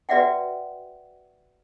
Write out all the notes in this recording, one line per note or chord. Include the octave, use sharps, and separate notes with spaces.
F#4 B4 D5 E5 F#5 G5